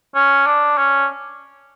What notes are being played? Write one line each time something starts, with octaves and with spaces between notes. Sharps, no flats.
C#4
D4
C#4